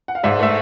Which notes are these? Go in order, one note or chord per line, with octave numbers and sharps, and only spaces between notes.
F#5
F5
G#2 D5 E5
A3 E5